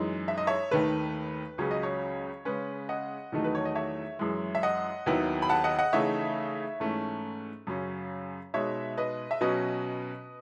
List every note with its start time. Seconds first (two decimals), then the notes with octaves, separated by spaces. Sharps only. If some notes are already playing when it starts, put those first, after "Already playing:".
Already playing: F#2 E3 G#3 D#4
0.28 E5
0.38 D#5
0.47 C#5 E5
0.71 D#2 D#3 A3 B4
1.58 C#2 C#3 F#3 C#4 C#5
1.71 D#5
1.83 C#5
2.45 C#3 G#3 C#4 B4
2.89 D#5 F#5
3.32 E2 D#3 F#3 A3 D#4
3.44 B4
3.55 C#5
3.65 D#5
3.75 C#5 E5
4.19 F#2 E3 G#3
4.55 E5
4.63 D#5 F#5
5.06 D#2 D#3 F#3 B3 E4
5.42 B5
5.49 F#5 A5
5.64 D#5 F#5
5.79 D#5 F#5
5.93 C#3 E3 A3 D#4 C#5 E5
6.80 G#2 E3 A3 C#4
7.67 F#2 C#3 F#3 C#4
8.54 B2 G#3 D#4 C#5 E5
8.97 B4 D#5
9.31 E5
9.41 B2 F#3 C#4 B4 D#5